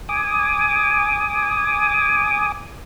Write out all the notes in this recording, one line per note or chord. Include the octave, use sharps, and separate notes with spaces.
G#5 D6 D#6